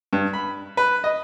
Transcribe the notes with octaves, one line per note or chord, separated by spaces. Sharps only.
G2
B5
B4
D#5